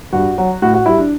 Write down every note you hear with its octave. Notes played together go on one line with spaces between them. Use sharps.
G2 F#4
F#3
A2 F#4
F#4
G3 E4
D4